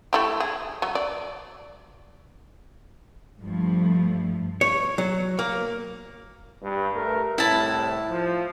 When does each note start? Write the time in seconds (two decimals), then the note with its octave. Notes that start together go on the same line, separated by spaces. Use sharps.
0.13 A3 E4 G4
0.40 G#4
0.82 F#3
0.95 D5
3.41 G2 F3 A3
4.61 C#5
4.98 F#3
5.39 A#3
6.63 G2
6.94 A3 A#4 B4
7.38 C2 A2 E4 A5
8.10 F3